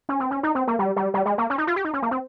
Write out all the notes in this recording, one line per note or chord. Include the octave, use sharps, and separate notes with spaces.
C#4
C4
C#4
D#4
C4
A#3
G3
G3
G3
G#3
A#3
C#4
D#4
F4
G4
D#4
C#4
A#3
C4